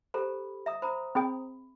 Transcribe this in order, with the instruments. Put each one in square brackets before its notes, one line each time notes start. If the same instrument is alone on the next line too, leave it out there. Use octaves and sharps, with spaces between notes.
[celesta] G4 A4 B5 [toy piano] C5 A#5
[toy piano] E5 A#5 D#6
[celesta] C5 A#5 D#6 [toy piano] B5
[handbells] C4 G#4 G5 [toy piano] B5